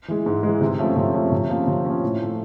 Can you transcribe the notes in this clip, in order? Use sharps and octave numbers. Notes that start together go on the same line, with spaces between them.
E3 G#3
G#2
E3 G#3
C3
F3 A3 C#4
C3
F3 A3 C#4
C3
F3 A#3 C#4
C3
F3 A#3 C#4
A2
F3 A3